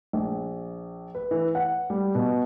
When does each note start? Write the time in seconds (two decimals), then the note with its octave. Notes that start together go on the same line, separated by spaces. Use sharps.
0.13 A#1
1.15 B4
1.31 E3
1.55 F#5
1.90 G3
2.15 B2